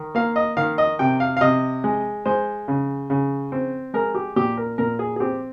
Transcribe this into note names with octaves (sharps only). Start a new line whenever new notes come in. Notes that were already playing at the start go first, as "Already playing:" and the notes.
Already playing: D#3
A#3 F5
D#5
D#3 F5
D#5
C3 G5
F5
F5
C3 D#5
G#3
G#3 C5
C#3
C#3
C4
G#3 A#4
G4
A#2 G4
A#4
A#2 A#4
G#4
G#4
C4 G4